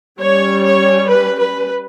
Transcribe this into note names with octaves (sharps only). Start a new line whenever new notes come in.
G3 C#4 C#5
C#5
B4
B4